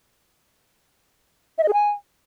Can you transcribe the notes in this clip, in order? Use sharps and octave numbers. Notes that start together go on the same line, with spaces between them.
E5
D#5
G#4
G#5